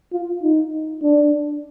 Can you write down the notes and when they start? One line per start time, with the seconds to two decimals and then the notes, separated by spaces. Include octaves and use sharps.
0.13 F4
0.43 D#4
1.02 D4